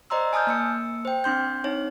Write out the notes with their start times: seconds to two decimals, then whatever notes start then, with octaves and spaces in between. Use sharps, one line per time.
0.10 C5 D5 D#5 A#5 C6 E6
0.33 G#5 A5 D#6 F6 G6
0.47 A#3 E6 C#7
1.05 C5 G5
1.24 C4 D4 C6 G6
1.64 C4 D#4 C#5